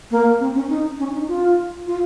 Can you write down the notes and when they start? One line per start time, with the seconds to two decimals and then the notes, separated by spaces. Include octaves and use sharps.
0.11 A#3
0.40 C4
0.55 C#4
0.69 D#4
0.99 C#4
1.13 D#4
1.28 F4
1.87 F4